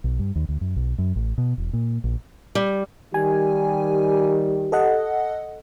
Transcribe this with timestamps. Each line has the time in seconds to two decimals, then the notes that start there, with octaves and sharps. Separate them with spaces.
0.04 B1
0.19 G2
0.36 D#2
0.49 D2
0.61 F#2
0.76 B1
0.98 F#2
1.16 A1
1.38 B2
1.58 E1
1.73 A#2
2.04 A#1
2.55 G3
3.14 D#3 G3 G4 G#5
4.72 A4 D#5 F#5